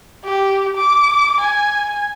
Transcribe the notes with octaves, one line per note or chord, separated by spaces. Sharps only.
G4
D6
G#5